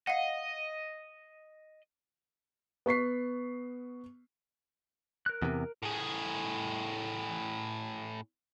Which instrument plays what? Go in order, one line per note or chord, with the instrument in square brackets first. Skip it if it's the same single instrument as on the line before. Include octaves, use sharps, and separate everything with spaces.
[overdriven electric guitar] D#5 [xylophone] F5 F#5
[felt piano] B3 C#6 B6 C7
[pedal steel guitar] A#4 F#6
[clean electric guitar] E2 C3
[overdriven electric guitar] A2 G#4